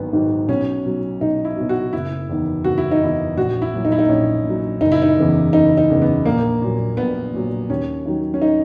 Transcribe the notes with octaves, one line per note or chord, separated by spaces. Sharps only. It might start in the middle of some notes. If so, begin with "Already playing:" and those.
Already playing: G#1 D#3 F#3 B3
G#2 D#3 F#3
B1 C#4
B2 F#3
B1 D#4
E4
B2 F#3
F#4
F#1 E4
E2 D#3
F#1 F#4
E4
D#4
E2 D#3 E4
A#1 F#4
E4
A#2 F#3
D#4
E4
D#4
A#1 C#4
A#2 F#3
F#1 D#4
E4
D#4
E2 C#3 E3
F#1 D#4
D#4
E2 C#3 E3
B3
A#1 A#3
A#2 F#3
A#1 B3
A#2 F#3
D#2 C#4
D#3 F#3
C#4
D#4